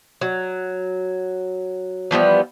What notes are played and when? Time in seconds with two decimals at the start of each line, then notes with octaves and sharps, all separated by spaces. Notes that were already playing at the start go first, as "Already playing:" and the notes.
0.21 F#3
2.11 E3 F3 G3 B3